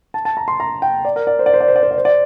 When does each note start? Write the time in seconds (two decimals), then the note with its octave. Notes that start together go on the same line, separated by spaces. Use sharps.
0.14 A5
0.25 A5
0.37 A#5
0.48 C6
0.60 A#5
0.82 G5
1.05 D5
1.16 A#4
1.27 D5
1.39 C5
1.46 D5
1.54 C5
1.60 D5
1.68 C5
1.76 D5
1.83 C5
1.91 D5
1.98 C5
2.05 D5